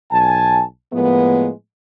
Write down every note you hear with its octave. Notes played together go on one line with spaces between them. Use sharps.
B1 G#5 A5
A2 F3 G#3 A#3 B3